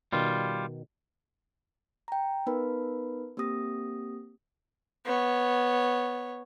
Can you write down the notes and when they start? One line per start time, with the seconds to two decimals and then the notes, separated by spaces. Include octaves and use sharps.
0.13 B2 D#3 G3 F4
2.08 G5 A#5
2.47 B3 D#4 A#4 B4 B5
3.37 A#3 C4 G4 D#6 A#6
5.05 B3 C#5